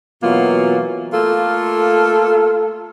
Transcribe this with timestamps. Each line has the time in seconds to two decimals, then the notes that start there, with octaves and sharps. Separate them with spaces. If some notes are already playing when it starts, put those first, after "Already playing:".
0.22 B2 E3 F#3 A#3 F4
1.13 A3 A#3 F4 A4